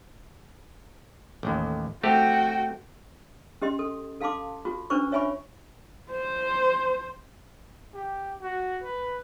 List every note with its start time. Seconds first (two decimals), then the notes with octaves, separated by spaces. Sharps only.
1.43 A1 D#2
2.03 A3 C4 F#4 G4 G5
3.62 C#4 G4 D#5 C6
3.79 A4
4.21 A4 F5 A5 C6 D6
4.65 F4 F#4
4.90 C#4 D4 B4 C5 C#6
5.12 C#5 E5 G#5 B5 C#6
6.11 C5
7.94 G4
8.41 F#4
8.83 B4